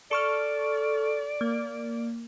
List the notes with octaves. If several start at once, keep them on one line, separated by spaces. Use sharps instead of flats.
A4 D5 C#6 F6
A#3